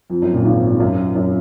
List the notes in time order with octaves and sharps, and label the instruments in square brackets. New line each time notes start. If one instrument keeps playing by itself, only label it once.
[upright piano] F2
F#2
A#1 A#2
G#1 G#2
G#2
F#2
F#2